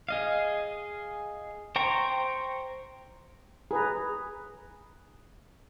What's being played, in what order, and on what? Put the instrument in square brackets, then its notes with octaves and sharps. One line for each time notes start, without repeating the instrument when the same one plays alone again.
[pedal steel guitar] G#4 D#5 F5
C5 G5 A#5 C6 C#6
[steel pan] G#4 B4 A#5